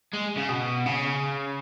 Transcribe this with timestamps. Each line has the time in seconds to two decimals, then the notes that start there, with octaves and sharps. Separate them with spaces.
0.14 G#3
0.37 C#3
0.49 B2
0.86 C#3